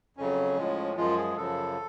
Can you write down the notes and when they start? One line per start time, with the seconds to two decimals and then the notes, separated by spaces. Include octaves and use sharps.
0.17 F2 C#3 F#3 C#4
0.57 A2 F3 G#3
0.97 F#2 F3 G#3 F4
1.17 G#4
1.36 F#2 C#3 F3 A4